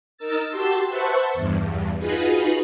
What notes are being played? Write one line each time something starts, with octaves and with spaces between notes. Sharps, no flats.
D#4 A#4 E6 A6
F#4 G4 A5 C6 E6
B4 C5 E5 F#5 A5 C#6
E2 G2
D#4 F4 F#4 G#4 B4